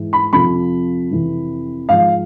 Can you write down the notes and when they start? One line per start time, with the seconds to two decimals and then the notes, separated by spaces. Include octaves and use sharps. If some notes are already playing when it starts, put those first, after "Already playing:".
Already playing: G#2 E3
0.13 B5
0.33 F2 C3 F3 B5
1.11 F2 C3 E3
1.89 G#2 F3 F5